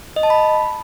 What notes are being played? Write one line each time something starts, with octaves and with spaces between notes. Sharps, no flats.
D#5
A5
B5